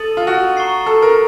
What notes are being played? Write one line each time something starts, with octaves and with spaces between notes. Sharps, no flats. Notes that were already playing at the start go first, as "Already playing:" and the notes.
Already playing: A4 D#6 A6 D#7 F#7
F4
F#4
A#5 C#6 A6 C7
A4
A#4